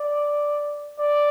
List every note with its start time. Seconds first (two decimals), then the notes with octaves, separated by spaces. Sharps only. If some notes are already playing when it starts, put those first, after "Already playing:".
Already playing: D5
0.99 D5